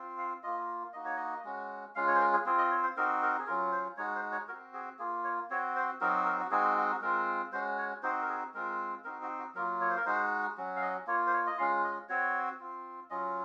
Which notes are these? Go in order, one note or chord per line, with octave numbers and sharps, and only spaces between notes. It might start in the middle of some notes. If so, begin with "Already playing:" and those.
Already playing: C4 F4
F5
A#3 F4 D#5
A#3 D#4 F#4 D#5
C#5
D#5
G#3 C#4 F#4
G#3 C#4 F4 F5
C#5
C5
A#4
G#4
C4 F4 G#4
D#5
C#5
C5
C4 D#4 F#4 A#4
A#4
G#4
F#3 C#4 F4 A#4
C5
G#3 D#4 F#4 C#5
C5
C#5
C4 F#4 A#4
G#4
A#3 F4 G#4
C#5
C4 F#4 C#5
C5
F#3 C4 D#4 F#4 A#4
A#4
F#4
G#3 C4 D#4 F#4 G#4
F#4
F#4
G#3 C4 F4 A#4
G#3 C#4 F#4 C5
C#5
C4 D#4 F#4 C5
A#4
G#4
G#3 C4 F4 A#4
C4 D#4 F#4 A#4
F#4
F#4
F#3 A#3 F4 A#4
C#5
C5
A#4
G#3 D#4 F#4 C5
F#3 C#4 F#4
F5
D#5
A#3 F4 C#5
C5
C#5
D#5
G#3 C#4 F4 F5
D#5
C4 F#4 C#5
C4 F4
F#3 C#4 F4 D#5